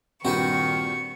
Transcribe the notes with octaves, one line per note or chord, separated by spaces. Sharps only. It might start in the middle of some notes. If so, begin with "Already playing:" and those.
G2 A#2 D#3 C4 F#4 G4 B4 C#6